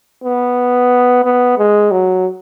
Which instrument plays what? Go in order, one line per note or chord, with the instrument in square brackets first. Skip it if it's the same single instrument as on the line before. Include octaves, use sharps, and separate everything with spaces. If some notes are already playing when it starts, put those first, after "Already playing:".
[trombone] B3
B3
G#3
F#3